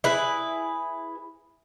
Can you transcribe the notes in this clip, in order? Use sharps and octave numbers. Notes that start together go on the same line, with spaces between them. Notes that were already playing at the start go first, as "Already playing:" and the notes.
E4 G#4 B4